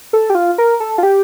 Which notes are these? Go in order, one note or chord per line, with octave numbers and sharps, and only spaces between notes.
A4
G4
F4
A#4
A4
F4
G4